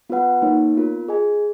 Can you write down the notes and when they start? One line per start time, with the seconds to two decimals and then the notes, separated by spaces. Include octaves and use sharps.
0.09 B3 F4 B4 F#5
0.42 A#3 D#4 A#4 C#5
0.75 B3 F4 A#4
1.08 G#4 D#5 G#5